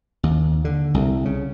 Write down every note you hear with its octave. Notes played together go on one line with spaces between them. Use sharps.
D#2
D3
C2
C#3